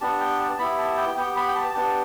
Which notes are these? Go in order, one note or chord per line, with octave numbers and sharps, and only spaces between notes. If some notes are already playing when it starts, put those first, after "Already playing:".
B3 D4 G4 A5
G5
A5
B3 E4 G4 B5
A5
G5
B3 G4 G5
B5
G5
A5
B3 D4 G4 A5